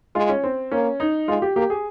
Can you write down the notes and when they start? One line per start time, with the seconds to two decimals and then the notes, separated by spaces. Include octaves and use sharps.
0.15 G#3 F4
0.29 C#4
0.43 C4
0.71 A#3 C#4
1.00 D#4
1.28 G#3 F4
1.42 G4
1.56 A#3 G4
1.70 G#4